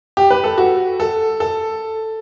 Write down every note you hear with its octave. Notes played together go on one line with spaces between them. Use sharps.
G4
B4
A4
F#4
A4
A4